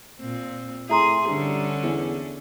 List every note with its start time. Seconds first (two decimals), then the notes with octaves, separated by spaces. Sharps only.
0.19 A#2 C4
0.89 A2 G#4 E5 A#5 C6
1.28 G2 D3 C#4
1.83 E2